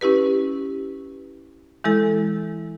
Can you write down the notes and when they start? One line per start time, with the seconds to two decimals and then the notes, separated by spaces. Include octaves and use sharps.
0.01 C#4 E4 G4 B4
1.84 E3 G#3 E4 A4